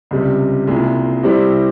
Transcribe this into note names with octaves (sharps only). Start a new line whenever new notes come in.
C#2 C3 G3
C2 A#2 G#3
C3 G3 C4 E4